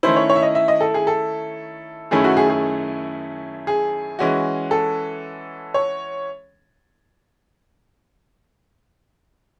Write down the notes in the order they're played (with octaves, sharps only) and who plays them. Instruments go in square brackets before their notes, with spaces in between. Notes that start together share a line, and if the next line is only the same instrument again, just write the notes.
[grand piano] D#3 A3 C#4 E4 [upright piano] C5
[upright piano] C#5
C#5
E5
D#5
E5
D#5
A4
G#4
A4
[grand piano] F#2 D#3 A3 C#4 E4 [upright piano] G#4
[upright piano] F#4
G#4
G#4
G#4
[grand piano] E3 G#3 C#4 F#4
[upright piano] A4
C#5